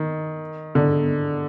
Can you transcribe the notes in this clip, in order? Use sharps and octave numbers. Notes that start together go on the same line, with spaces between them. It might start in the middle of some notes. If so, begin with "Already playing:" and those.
Already playing: D#3
D3